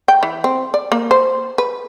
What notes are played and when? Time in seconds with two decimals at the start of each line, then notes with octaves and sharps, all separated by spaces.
0.08 G5
0.23 E3
0.44 C4
0.74 D5
0.92 A#3
1.11 C5
1.58 B4